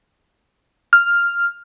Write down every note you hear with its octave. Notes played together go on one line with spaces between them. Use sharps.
F6